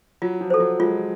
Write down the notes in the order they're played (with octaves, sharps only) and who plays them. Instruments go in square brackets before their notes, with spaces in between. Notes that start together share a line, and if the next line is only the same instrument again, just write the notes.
[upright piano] F#3 [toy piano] F4
[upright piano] F3
[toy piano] A4 C5
[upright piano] F#3
[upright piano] G#3 [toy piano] F4